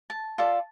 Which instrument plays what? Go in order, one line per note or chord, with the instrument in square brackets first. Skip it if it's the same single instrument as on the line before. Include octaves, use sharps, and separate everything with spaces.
[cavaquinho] A5
F4 A4 D5